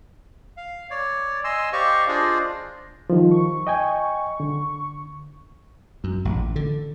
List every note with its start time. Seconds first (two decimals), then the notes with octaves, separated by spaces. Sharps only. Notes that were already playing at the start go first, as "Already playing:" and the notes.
0.57 F5
0.91 C#5 D5
1.44 D#5 G#5 C6 E6
1.73 G4 C5 D5 D#5 F5 C#6
2.08 D4 F4 G#4 C5 D5 D#5
3.10 D#3 F3 G3
3.31 C#6
3.67 D#5 G5 G#5
4.40 D3
6.04 F#2
6.25 A1
6.56 D3